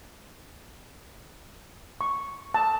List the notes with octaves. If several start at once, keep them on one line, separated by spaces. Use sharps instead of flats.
C#6
A5